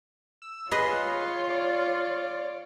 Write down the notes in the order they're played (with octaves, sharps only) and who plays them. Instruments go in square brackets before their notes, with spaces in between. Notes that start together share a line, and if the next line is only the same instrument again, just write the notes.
[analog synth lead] E6
[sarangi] F4 [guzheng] G#4 B4 D#5 [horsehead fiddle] C#5 [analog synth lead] C6
[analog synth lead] D5